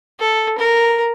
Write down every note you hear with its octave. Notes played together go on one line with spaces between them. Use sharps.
A4
A#4